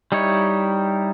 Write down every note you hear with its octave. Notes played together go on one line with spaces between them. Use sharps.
G3 D#4 E4 C#5